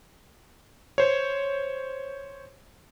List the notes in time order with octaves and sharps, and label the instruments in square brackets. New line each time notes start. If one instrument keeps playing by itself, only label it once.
[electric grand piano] C5 C#5